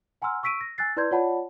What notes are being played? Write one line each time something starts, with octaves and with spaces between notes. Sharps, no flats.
F#5 G#5 A#5 C6 E6 F6
C#6 E6 B6 D7 D#7
A#6
G#5 E6 F#6 A6 C7
E4 B4 D5 C6 G6 G#6
F4 C#5 D5 F#5 A5 B5